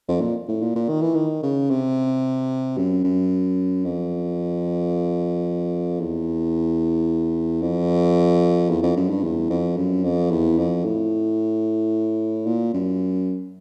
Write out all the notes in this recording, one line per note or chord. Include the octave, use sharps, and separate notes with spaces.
F2
A#2
A2
A#2
A#2
D#3
E3
D#3
C#3
C3
F#2
F#2
F2
E2
F2
E2
F2
F#2
G2
E2
F2
F#2
F2
E2
F2
A2
A#2
F#2